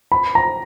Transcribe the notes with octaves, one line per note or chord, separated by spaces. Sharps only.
B5
A#5